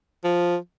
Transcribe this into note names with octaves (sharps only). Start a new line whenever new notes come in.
F3